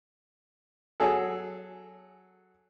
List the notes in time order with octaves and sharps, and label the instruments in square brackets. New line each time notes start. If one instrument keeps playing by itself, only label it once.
[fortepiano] F#3 G#4 A4